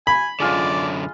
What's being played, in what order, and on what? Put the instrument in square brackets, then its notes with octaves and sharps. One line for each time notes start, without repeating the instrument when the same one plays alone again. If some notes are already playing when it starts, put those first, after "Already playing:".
[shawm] G#5 [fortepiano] B5
[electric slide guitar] F#2 D3 [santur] G#3 F4 D#5 [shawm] D5